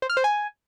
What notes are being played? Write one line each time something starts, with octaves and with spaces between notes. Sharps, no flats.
C5
F6
C5
G#5